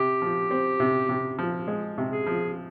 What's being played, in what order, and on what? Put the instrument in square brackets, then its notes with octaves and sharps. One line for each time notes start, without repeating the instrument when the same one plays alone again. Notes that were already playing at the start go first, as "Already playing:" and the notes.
Already playing: [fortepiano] C3 [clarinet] G4
[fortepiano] F3
C4
C3
C3
F3
G#3
C3
[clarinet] G#4
[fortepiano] F3